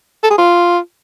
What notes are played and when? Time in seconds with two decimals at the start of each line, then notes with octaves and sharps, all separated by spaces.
0.23 A4
0.31 G#4
0.38 F4